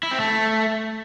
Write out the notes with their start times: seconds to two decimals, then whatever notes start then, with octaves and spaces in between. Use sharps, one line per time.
0.03 E4
0.11 C4
0.20 A3